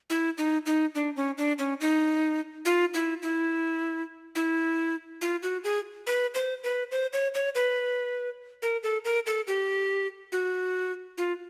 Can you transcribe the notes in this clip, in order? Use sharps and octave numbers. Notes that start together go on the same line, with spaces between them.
E4
D#4
D#4
D4
C#4
D4
C#4
D#4
F4
E4
E4
E4
F4
F#4
G#4
B4
C5
B4
C5
C#5
C#5
B4
A#4
A4
A#4
A4
G4
F#4
F4